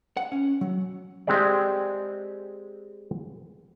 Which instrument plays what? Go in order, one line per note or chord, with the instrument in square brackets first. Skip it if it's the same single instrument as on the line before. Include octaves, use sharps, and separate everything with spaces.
[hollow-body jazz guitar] F#5
C#4
F#3
[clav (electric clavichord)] G#3 C4 G4 G#4 D5